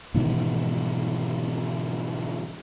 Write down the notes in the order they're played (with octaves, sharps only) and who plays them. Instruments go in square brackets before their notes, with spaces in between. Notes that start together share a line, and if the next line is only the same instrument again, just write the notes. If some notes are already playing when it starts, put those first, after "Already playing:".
[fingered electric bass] G#2 B2 D#3 E3